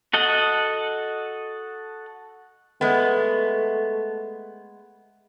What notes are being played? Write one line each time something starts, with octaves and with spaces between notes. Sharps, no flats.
F#4 A4 D#5 F#5
G#3 A3 B3